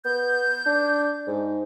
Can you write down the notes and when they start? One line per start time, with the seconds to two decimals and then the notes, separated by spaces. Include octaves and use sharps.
0.05 B3 G6
0.66 D4
1.27 G#2